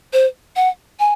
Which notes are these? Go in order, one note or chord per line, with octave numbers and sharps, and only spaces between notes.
C5
F#5
G#5